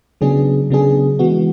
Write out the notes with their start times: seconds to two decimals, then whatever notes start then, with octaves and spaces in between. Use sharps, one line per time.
0.21 C#3 F#3 B3 D4 G#4
0.70 C#3 F#3 B3 D4 G#4
1.19 E3 G#3 B3 F#4